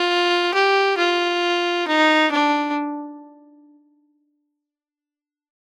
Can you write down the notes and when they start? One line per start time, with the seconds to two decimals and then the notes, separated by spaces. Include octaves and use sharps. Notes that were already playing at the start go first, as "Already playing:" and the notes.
Already playing: F4
0.54 G4
0.98 F4
1.87 D#4
2.31 D4